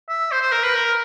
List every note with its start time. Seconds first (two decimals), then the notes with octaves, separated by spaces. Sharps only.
0.09 E5
0.32 C5
0.42 C5
0.52 A#4
0.63 B4
0.75 A#4